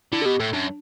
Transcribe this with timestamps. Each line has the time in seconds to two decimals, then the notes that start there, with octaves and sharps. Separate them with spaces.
0.12 D3 E4
0.22 A4
0.25 B2 G4
0.40 A2 A4
0.53 F#2 D4